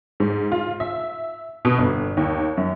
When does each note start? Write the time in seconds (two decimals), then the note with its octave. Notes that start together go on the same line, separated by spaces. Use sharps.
0.20 G#2
0.52 F4
0.80 E5
1.65 B2
1.78 G1
2.17 D#2
2.57 F#2